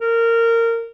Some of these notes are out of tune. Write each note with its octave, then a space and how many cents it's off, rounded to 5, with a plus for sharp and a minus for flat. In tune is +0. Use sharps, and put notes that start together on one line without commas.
A#4 -20